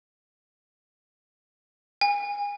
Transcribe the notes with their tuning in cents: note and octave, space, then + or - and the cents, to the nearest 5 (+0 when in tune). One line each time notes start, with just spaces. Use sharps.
G#5 -30